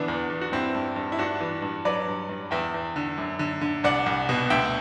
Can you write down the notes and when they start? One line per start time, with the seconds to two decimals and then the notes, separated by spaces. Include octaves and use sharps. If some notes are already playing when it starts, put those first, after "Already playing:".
Already playing: D3 E3 B3 D4
0.08 E2
0.30 E2
0.41 F#4
0.52 G2 C4 E4
0.75 G2
0.96 G2
1.12 E4
1.19 G2 D4 F#4
1.40 E3
1.62 G2
1.85 F#3 B4 D5
2.08 G2
2.29 G2
2.51 E2 E5 G5
2.74 E2
2.96 D3
3.17 F#2
3.39 D3
3.61 D3
3.84 C2 D5 F#5
4.06 C2
4.29 B2
4.50 D2 E5 G5